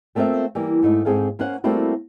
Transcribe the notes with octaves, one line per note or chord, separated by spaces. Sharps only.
G3 A3 A#3 C4 F4 E5
E3 G3 A#3
G#2 A3 D#4
G#2 C4 G#4 A4 F5
A#3 C#4 C5 F#5
G3 A3 A#3 C4 E4 F#4